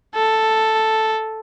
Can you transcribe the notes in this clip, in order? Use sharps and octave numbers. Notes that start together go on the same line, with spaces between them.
A4